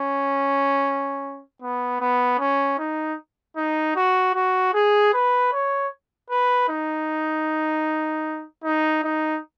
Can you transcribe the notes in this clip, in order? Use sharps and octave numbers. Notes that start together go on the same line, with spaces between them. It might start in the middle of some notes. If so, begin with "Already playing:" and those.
Already playing: C#4
B3
B3
C#4
D#4
D#4
F#4
F#4
G#4
B4
C#5
B4
D#4
D#4
D#4